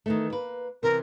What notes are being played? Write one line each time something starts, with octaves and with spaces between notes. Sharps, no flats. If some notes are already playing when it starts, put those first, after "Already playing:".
D#3 E3 A3
A#3 B4
C3 E3 A#4